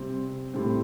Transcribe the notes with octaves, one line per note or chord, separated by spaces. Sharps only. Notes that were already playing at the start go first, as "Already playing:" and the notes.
Already playing: C3 G3 C4
A2 G3 C4